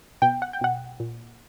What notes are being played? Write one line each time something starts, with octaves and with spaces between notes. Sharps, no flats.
B2 G5
F#5
G5
B2 F#5
A#2